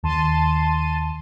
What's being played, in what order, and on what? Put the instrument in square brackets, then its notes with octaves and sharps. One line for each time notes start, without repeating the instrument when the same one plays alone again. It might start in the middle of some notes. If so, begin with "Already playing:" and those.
[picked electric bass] D#2 [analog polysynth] A5 C6 D#7